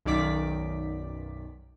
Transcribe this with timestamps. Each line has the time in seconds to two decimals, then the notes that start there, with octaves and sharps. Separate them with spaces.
0.06 B1 F#2 D#3 D5 D6 B6